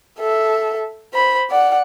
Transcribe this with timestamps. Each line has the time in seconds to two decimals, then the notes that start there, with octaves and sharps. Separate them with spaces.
0.19 A4 E5
1.14 C5 B5
1.50 D5 F#5